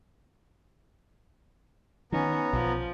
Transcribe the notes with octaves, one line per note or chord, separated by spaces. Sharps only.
D#3 F3 B3 C#4 D#4 A#5
B1 B2 F3